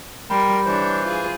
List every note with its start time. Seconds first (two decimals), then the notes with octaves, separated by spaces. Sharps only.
0.30 G3 A#4 G5 B5 C6
0.66 E3 D4 C5 C#5
1.05 F4 G#4